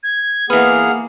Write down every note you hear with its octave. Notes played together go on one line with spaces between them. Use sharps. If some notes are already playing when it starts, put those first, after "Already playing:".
G#6
E3 A#3 B3 G#4 F#5 F6